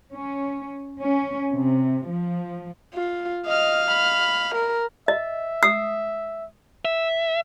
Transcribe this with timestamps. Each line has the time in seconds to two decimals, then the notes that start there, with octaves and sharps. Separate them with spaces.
0.13 C#4
1.01 C#4
1.53 C3
2.07 F3
2.95 F4
3.46 D#5 F5 F6
3.91 B5
4.55 A#4
5.08 D#5 E5
5.63 D#6 E6 C7
6.85 E5